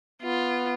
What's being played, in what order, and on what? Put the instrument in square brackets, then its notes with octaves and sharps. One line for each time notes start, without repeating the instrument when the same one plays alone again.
[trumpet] B3 [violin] F4